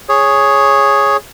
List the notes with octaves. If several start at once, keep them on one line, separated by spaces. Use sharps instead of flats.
G#4 C#5